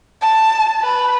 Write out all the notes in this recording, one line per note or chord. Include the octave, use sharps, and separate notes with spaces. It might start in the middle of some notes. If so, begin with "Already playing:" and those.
A5
B4